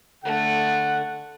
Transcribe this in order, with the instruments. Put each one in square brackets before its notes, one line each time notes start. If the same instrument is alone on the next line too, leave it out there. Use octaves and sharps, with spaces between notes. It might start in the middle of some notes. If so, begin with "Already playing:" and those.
[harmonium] D3 [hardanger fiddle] A3 [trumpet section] F#5